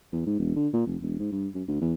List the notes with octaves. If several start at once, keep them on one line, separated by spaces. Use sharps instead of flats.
E2
G#2
E1
D3
A#2
F1
E1
G#2
G2
F#2
D2
E2